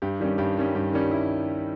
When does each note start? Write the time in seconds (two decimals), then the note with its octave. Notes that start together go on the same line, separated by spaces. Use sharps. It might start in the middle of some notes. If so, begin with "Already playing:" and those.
0.02 G2 G4
0.20 D#3 G3 C#4 G4
0.38 G2 G4
0.57 D#3 G3 C#4
0.75 G2 G4
0.93 D#3 G3 C#4
1.11 E4